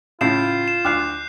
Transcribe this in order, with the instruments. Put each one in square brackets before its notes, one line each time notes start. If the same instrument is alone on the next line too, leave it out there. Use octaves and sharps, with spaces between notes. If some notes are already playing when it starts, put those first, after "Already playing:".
[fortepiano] A2 C#3 E4 [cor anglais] F4 [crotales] G6 C7 E7
[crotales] E7
[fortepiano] D2 F6 [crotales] D6 F#6 C7